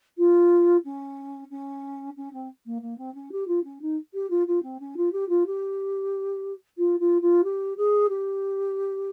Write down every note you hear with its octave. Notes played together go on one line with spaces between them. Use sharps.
F4
C#4
C#4
C#4
C4
A#3
A#3
C4
C#4
G4
F4
C#4
D#4
G4
F4
F4
C4
C#4
F4
G4
F4
G4
F4
F4
F4
G4
G#4
G4